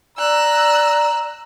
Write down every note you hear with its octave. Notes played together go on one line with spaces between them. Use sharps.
D5 A#5 E6 F#6